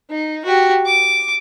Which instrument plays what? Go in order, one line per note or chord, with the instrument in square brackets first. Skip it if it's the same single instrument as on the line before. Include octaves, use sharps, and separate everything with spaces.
[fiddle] D#4
F#4 G4
D6